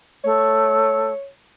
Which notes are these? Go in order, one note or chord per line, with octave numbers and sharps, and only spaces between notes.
A3 C#5